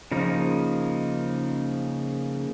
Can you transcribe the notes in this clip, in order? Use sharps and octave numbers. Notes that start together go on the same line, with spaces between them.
C#3 F3 A#3 D#4